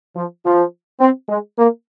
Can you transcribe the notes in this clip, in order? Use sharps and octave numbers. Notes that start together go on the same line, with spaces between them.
F3
F3
C4
G#3
A#3